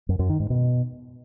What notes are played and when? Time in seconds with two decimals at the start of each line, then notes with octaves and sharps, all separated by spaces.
0.09 F#2
0.19 F#2
0.29 D#3
0.40 G#2
0.50 B2